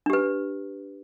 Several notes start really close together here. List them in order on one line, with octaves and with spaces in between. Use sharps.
D4 G4 B4